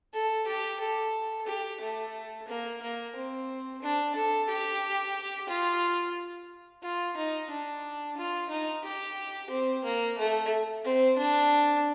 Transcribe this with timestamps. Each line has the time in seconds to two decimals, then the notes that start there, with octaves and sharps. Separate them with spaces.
0.14 A4
0.47 G4
0.80 A4
1.47 G4
1.81 A3
2.48 A#3
2.82 A#3
3.15 C4
3.82 D4
4.16 A4
4.49 G4
5.49 F4
6.83 F4
7.17 D#4
7.50 D4
8.17 F4
8.50 D#4
8.84 G4
9.50 C4
9.84 A#3
10.18 A3
10.84 C4
11.18 D4